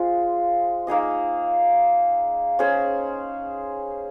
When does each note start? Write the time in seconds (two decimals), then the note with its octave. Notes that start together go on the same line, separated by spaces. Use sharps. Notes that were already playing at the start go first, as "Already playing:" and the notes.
Already playing: G#3 F4 C5
0.87 A#3 D#4 G#4 D#5
2.59 C#4 G#4 C5